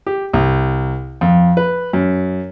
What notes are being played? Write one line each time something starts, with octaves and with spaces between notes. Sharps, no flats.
G4
C2
F2
B4
F#2